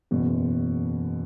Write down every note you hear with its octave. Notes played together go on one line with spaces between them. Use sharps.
F#1 E2 B2